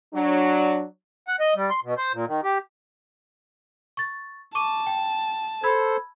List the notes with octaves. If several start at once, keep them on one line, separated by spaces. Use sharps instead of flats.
F#3 D4
F#5
D#5
G3
C6
B2
C5
A#2
D#3
G4
C#6 A6
A5 C#6 D6 D#7
G5
A4 C5 B5 E6 G#6